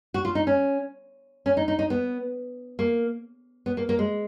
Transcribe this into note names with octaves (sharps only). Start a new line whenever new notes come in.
F#4
F4
D#4
C#4
C#4
D#4
D#4
D#4
B3
A#3
B3
A#3
A#3
G#3